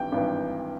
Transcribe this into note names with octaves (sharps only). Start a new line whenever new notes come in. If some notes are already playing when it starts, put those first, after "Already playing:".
Already playing: G#1 G2 E3 G5
G#1 G2 E3